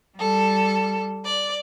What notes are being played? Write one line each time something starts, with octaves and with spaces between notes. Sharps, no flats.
G3 A4
D5